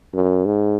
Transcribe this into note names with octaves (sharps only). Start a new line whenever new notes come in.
F#2
G#2